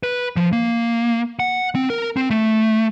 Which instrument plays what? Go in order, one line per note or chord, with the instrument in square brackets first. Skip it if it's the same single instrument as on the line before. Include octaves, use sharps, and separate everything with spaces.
[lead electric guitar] B4
F3
A#3
F#5
C4
A#4
C4
A3